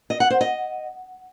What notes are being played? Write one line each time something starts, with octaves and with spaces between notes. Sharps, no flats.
D#5
F#5
C5
D#5